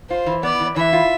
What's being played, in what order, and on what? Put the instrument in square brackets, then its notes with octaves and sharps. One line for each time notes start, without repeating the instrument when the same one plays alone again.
[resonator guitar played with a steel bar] F4 [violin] C5
[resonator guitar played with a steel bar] E3
[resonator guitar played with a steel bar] B3 [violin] D5
[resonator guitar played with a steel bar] E3
[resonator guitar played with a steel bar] E3 [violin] E5
[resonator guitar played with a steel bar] F4